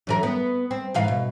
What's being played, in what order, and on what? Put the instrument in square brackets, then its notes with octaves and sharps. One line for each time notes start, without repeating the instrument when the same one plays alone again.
[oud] F#2 E3 A#4
B3
C4
G#2 E3 F5
B2